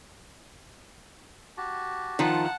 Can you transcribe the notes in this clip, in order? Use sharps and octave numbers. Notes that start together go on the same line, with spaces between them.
F#4 G4 A5
D#3 F3 D#4 F4 F#5 A5